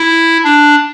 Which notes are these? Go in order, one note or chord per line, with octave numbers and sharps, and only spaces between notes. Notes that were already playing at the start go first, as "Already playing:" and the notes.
Already playing: E4
D4